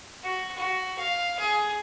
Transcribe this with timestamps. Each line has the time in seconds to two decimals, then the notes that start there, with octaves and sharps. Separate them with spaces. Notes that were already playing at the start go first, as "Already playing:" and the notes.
0.23 F#4
0.57 F#4
0.99 F5
1.39 G#4